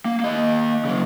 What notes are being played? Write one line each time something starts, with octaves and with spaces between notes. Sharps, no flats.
A#3
A#3 D#5
C#3 F#3